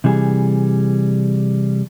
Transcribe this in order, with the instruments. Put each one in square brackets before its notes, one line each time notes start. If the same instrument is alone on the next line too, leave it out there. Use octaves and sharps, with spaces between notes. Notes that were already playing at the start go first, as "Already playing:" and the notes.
[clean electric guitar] C3 E3 G3 G#4